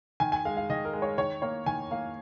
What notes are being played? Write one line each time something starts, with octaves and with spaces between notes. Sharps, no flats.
D#3 G#5
G#5
G#3 F5
F5
D#3 D#5
A#4
G#3
C#5
D#3 C#5
A#3 C#5
D#3 G#5
A#3 F5